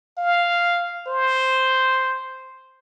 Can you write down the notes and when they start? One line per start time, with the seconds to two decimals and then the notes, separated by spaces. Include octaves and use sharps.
0.17 F5
1.07 C5